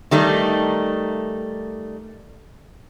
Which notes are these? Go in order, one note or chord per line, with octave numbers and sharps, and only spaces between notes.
D#3 G3 A3 D#4